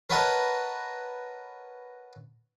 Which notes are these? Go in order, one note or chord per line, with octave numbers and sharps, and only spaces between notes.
A#4 B4 C#5 D#5 F#5 A5